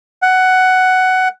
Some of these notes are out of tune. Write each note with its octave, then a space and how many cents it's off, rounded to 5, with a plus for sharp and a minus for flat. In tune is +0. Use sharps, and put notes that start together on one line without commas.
F#5 +10